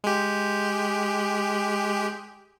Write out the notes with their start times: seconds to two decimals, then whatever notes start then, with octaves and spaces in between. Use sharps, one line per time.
0.04 G#3 G4